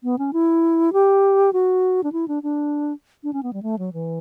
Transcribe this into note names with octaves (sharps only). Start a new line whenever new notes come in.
B3
C#4
E4
G4
F#4
D4
E4
D4
D4
D4
C#4
B3
G3
A3
F#3
E3